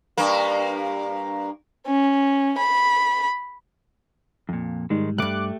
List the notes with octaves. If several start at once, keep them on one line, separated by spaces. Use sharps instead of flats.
G2 A#3
C#4
B5
F2 A#2
G#2 D#3 G3 G#3
C#2 G2 A3 G4 D6 F#6